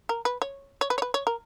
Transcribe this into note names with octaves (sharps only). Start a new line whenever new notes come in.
A#4
B4
C#5
C#5
B4
C#5
B4
C#5
A#4